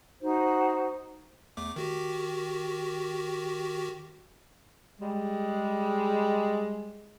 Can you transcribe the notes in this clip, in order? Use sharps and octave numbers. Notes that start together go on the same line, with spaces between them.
D#4 F#4 C5
E2 A3 D6
D#3 F#4 G4
G3 G#3